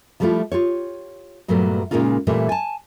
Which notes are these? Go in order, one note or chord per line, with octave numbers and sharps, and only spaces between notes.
F3 G3 A3 B3 E4 F4
F4 G4 C#5
G2 A#2 F#3 G3 A3 B3
A#2 C#3 G#3 A#3 D#4 F4
A#2 E3 G3 A3 C4
G#5 A5